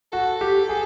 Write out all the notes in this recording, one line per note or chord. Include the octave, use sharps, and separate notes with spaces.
F#4 A4
G4
G#4